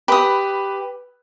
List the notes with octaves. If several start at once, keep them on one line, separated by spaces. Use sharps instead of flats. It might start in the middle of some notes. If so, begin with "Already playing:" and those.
G4 B4 B5 D#6